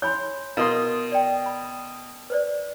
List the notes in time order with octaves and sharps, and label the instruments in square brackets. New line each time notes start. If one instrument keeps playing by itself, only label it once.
[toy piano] C#5 G#5 B5 [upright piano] C6 G6
[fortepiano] B2 D#5 C6 [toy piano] E4 F5 [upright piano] A#4
[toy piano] D5 G5
B5
B4 C5 D5